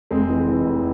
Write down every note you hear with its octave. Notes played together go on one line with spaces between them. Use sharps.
F1 G#3 C4
E3
E3
F1